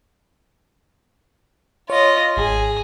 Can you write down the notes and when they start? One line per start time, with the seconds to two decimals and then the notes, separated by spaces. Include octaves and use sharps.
1.90 F4 C#5 D#5
2.37 G#1 G#4